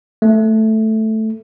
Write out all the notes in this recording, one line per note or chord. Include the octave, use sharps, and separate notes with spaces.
A3